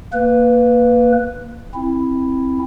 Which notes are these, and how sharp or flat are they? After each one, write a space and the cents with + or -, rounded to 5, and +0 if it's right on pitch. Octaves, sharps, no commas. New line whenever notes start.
A#3 +0 B4 +0
C4 +15 E4 +0